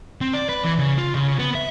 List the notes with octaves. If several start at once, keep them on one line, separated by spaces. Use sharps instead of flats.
C4
D5
B4
E3
C#3
F4
C#3
B3
E5